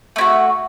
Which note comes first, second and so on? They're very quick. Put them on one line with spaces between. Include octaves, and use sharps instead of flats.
A3 E4 F#4